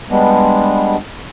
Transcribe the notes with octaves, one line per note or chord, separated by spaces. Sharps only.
G3 G#3 B3 D4